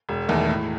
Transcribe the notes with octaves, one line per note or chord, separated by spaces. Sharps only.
E1
E2 D#3 A3
A2